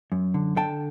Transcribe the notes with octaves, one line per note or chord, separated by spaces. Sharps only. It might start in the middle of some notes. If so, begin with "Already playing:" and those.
F#2
D3
D3 G5 A5